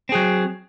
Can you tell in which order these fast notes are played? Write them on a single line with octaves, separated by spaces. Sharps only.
C4 G#4 F#3